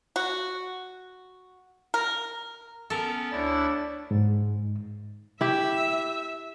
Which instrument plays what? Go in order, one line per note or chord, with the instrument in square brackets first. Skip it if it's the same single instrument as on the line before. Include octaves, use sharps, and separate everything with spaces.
[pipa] F#4
A#4
[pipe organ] B3 C#4 [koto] A4 A#4
[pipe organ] D2 E4 A6 [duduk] D4 [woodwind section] C#5 D5 E5
[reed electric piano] G#2
[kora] E4 G4 [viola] E5